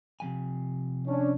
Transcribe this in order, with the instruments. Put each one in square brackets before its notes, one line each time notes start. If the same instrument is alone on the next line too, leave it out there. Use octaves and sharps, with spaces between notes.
[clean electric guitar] C3 F3 G#5
[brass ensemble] C#4 D4